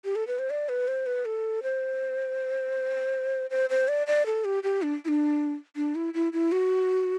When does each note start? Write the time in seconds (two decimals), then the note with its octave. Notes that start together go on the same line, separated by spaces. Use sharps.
0.05 G4
0.16 A4
0.27 B4
0.39 C5
0.50 D5
0.69 B4
0.88 C5
1.06 B4
1.25 A4
1.63 C5
3.50 C5
3.70 C5
3.88 D5
4.07 D5
4.26 A4
4.45 G4
4.63 G4
4.82 D4
5.05 E4
5.08 D4
5.76 D4
5.95 E4
6.14 E4
6.33 E4
6.52 F#4